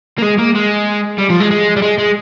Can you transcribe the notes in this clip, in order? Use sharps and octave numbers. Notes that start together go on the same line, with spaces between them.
A#3
G#3
A#3
G#3
G3
F3
G#3
G#3
G3
G#3
G#3